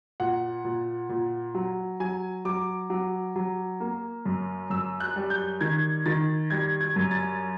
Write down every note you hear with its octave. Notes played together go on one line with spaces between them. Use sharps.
A#2 F#5
A#2
A#2
F#3
F#3 G#5
F#3 D6
F#3
F#3
A#3
F#2
F#2 E6
F#6
G3
G6
D#3 G#6
D#3 A6
G3 G#6
G#6
F#2
A6